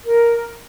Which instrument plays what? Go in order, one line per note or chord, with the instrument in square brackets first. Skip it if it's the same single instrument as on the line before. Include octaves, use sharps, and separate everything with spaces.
[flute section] A#4